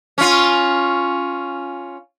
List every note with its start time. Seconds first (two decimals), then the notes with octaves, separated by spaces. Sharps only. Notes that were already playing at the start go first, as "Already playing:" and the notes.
0.18 C#4 F4